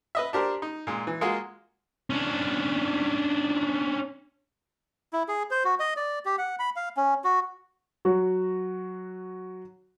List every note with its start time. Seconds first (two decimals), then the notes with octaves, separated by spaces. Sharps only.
0.15 B4 D#5 E5
0.33 D4 G4 A#4 C5
0.62 D#4
0.87 A#2 G#3
1.07 E3
1.21 G#3 A#3 F4 F#4 G#4
2.10 C#4 D4
5.13 E4
5.28 G#4
5.51 C5
5.65 F#4
5.80 D#5
5.97 D5
6.25 G4
6.38 F#5
6.59 B5
6.76 F5
6.97 C#4
7.24 F#4
8.05 F#3 F#4